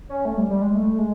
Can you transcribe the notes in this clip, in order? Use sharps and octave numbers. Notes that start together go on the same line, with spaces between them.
C#4
A3
G3
G3
G#3
A3
G#3